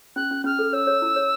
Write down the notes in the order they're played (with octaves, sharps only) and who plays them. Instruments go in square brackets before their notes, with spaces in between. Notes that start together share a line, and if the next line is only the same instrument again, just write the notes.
[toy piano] C#4 [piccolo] F#6
[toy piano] C#4
[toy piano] C#4 [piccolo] F6
[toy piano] A4
[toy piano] C#5 [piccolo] E6
[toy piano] C#5
E4
C#5